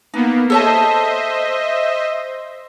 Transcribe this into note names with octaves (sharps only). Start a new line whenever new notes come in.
A#3 B3 D#4
A4 C5 C#5 D#5 E5 A5